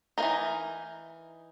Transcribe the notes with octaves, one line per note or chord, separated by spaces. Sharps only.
A#3 D#4 A#4
E3